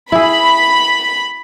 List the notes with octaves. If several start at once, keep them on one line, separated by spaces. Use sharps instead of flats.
E4 G#4 B5